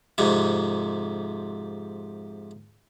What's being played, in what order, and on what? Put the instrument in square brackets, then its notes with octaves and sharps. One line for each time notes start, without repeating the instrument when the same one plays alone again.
[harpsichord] F2 G#2 C3